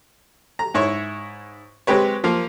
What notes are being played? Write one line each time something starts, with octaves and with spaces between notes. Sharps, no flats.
A#5
G#2 E4 C#5 C#6
G#3 C4 G4 B4 C#5
F3 A#3 F4